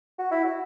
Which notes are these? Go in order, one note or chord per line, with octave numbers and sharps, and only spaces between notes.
F#4
E4
F#4